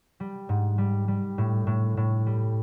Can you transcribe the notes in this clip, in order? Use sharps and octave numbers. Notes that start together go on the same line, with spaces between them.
G3
G#2
G3
G3
A2
A2
A2
G3